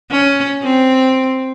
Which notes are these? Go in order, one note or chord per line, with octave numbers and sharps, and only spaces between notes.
C#4
C4